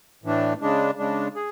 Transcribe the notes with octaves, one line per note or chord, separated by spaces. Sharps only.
A2 E3 A3 D4
C#3 G#3 D4
C#3 G#3 D4
G#4